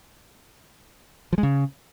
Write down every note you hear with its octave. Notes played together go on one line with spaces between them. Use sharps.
F3
G#3
C#3